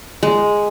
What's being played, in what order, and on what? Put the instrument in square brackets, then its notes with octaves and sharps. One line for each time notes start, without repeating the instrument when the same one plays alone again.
[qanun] G#3